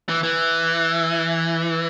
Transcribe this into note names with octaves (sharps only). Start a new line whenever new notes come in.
E3
E3